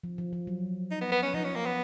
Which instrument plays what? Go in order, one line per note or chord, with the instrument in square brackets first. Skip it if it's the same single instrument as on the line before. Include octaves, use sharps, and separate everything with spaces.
[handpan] F3
F3
F3
F#3
[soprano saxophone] D#4
B3
B3
C#4
[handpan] F3 [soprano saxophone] D#4
[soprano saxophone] C#4
A#3
B3